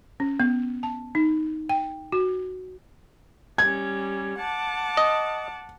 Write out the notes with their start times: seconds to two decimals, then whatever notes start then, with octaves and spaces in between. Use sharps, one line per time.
0.20 C#4
0.40 B3
0.83 A5
1.15 D#4
1.69 G5
2.12 F#4
3.58 G3 C#4 G#6
4.37 F#5 A5 D6
4.97 D#5